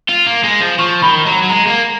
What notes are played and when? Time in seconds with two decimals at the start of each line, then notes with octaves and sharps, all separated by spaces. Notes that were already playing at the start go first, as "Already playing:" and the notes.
0.09 F4
0.27 A#3
0.44 G#3
0.61 F3
0.79 F3 C#6
1.02 D#3 B5
1.26 F#3 A#5
1.42 F#3
1.50 G#3 A#5
1.67 A#3